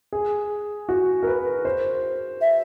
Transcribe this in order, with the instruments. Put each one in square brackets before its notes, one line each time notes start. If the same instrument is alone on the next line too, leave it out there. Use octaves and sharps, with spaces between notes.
[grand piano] G#4
F#4
A#4
B4
C5
[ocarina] E5